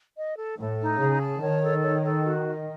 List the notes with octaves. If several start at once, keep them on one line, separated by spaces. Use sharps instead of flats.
D#5
A4
A2 A4
D#4
C#3 G#4
A5
D#3 C#5
A4
C#5
A4
F#4
D#5